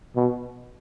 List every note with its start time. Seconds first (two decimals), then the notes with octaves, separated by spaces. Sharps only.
0.16 B2